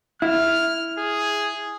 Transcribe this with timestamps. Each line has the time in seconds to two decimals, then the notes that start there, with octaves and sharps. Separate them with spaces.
0.22 E4 F6
0.98 G#4